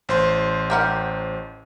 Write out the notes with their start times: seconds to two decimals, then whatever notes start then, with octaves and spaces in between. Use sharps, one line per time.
0.09 A1 C5 C6
0.70 G4 A#4 F#5